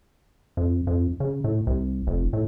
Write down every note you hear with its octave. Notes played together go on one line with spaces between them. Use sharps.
F2
F2
C#3
A2
C2
F1
A2